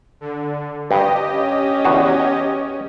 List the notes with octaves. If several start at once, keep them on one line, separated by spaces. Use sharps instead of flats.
D3
G2 G4 D#5
C#4
E2 F#4 G#4